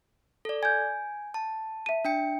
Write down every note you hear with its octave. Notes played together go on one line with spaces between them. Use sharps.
A4 D5
G#5 G6 G#6
A5
E5 D#7
D4 G5 C#7